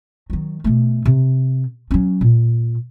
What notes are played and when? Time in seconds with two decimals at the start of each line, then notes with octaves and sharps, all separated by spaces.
0.30 D#3 F#3
0.64 B2 A3
1.05 C3
1.91 F#3 C#4
2.21 A#2